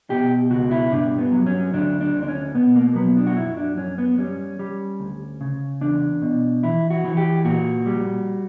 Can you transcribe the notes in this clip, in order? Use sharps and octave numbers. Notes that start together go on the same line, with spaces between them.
B2 G4
C#2 F#4
E4
G2 D4
B3
F#3
C#4
D2 D4
D4
D2
D4
C#4
B2 B3
A#3
F#3 B3
D4
F#4
F#2 E4
D4
F#2 C#4
B3
G3 C#4
G3
D2
C#3
E2 D4
B2
E3 E4
F#4
E3
G4
A#2 F#4
G3